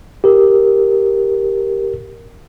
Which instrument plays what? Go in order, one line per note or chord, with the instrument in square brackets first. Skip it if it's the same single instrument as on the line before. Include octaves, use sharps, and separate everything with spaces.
[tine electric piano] G4 A#4